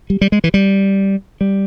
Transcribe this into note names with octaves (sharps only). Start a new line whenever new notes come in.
G3
G3
G#3
E3
G3
G3